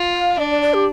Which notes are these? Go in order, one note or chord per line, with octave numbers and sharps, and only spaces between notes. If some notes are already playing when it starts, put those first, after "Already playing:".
Already playing: F4
F5
D4 D5
D5
D5
G4